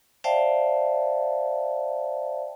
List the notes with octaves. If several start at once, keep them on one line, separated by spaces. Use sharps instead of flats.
C5 D5 E5 F5 G5 A5